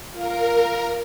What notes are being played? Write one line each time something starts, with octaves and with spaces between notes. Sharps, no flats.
F4 A#4 F5